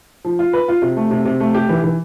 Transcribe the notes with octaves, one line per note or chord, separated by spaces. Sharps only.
F3
F4
B4
F4
C3
A3
C3
C3
A3
G4
E3
E3